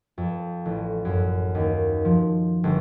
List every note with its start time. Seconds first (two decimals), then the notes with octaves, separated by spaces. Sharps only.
0.18 F2
0.65 A1
1.05 F#2
1.55 D#2
2.05 F3
2.64 G1